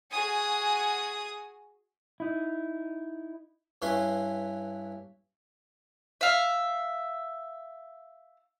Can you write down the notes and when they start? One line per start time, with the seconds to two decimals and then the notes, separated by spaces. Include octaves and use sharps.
0.11 F#4 G#4 G#5 D#6
2.20 D#4 E4
3.82 G2 C#4 E4 B4 C6
6.21 E5 F5